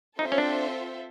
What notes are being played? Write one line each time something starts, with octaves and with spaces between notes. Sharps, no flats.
C4 D#4 F4 A4 C5 E5
C#4
D4